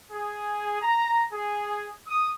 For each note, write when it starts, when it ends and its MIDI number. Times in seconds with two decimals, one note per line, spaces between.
0.11 0.81 68
0.82 1.23 82
1.32 1.88 68
2.07 2.29 87